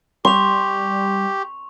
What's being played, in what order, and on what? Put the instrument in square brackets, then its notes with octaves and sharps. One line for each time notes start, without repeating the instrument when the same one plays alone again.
[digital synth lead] G3 [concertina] G4 [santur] C6 [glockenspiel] C#6 F7